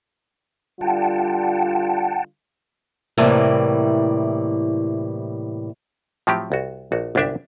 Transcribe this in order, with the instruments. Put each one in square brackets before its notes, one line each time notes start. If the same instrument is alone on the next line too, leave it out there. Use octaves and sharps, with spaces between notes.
[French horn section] D3 G3 F4 [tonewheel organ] F#5 G5 A5
[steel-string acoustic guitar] A2 C3 E3 G3 A#3
[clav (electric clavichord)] A2 F3 F#3 C4 G4
C2 F#4
A#1 F#4
G1 C2 F#2 D4 G4 E5